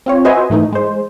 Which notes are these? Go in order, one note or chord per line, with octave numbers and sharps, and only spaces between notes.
C4 F4 C#5
F#4 B4 C5 D#5 E5 G#5
G#2 E3 A3 D#4
G#3 C5